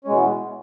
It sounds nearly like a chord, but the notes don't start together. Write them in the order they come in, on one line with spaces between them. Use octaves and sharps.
C#4 G#3 B2 E3 B3